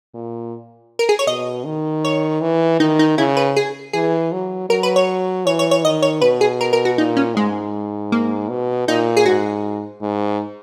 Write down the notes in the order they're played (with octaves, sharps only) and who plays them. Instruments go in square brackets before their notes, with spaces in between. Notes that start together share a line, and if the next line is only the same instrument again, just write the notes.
[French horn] A#2
[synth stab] A#4
G#4
C#5
[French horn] B2 [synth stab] D#5
[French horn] D#3
[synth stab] C#5
[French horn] E3
[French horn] D#3 [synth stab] D#4
[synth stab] D#4
[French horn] C#3 [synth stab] E4
[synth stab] B4
G#4
[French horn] E3 [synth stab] G#4
[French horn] F#3
[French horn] F#3 [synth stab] A#4
[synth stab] B4
C#5
[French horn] E3 [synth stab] C#5
[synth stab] C#5
C#5
[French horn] D#3 [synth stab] D#5
[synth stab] C#5
[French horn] B2 [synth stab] B4
[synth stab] G#4
A#4
A#4
F#4
[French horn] A#2 [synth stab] D#4
[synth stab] C#4
[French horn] G#2 [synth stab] G#3
[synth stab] A#3
[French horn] B2
[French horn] A#2 [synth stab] D#4
[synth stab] G#4
[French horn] G#2 [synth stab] F#4
[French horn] G#2